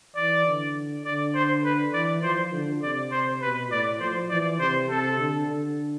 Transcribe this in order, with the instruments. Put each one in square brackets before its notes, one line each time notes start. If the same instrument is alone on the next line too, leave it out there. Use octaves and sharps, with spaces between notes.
[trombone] E3 [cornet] D5
[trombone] D3
[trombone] D3 [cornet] D5
[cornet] C5
B4
[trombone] E3 [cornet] D5
[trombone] F3 [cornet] C5
[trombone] D3
[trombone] C3 [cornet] D5
[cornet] C5
[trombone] B2 [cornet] B4
[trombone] A2 [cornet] D5
[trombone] F3 [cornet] C5
[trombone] E3 [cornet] D5
[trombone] C3 [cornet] C5
[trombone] C3 [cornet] A4
[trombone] D3
D3